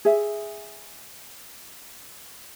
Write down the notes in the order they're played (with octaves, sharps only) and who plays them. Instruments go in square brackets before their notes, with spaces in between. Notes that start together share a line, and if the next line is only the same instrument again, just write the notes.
[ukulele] G#4 E5